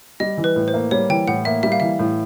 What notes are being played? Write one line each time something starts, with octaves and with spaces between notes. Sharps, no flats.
G3 D#5
E3
B4
A2
C5
A#3
G3 C#5
E3 G5
A2 F#5
A#3 E5
G3 E5
F5
E3 E5
A2